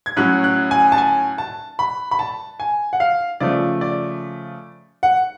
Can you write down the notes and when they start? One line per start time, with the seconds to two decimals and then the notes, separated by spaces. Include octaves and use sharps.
0.06 G#6
0.17 A2 F#3 C#4 F#6
0.44 F#6
0.71 G#5
0.92 A5
0.98 G#5
1.38 A5
1.79 B5
2.11 B5
2.19 A5
2.60 G#5
2.93 F#5
3.00 F5
3.40 C#3 F3 A3 D5
3.81 D5
5.03 F#5